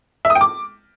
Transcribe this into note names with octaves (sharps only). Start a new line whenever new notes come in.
E5
D#6
G5
D6